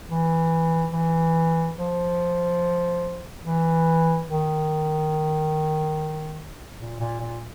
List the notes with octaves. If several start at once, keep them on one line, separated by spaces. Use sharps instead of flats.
E3
E3
F3
E3
D#3
A#2
A#2
A#2